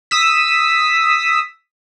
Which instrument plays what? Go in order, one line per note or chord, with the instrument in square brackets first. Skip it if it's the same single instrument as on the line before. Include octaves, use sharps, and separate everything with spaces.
[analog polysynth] D#6 E6 B6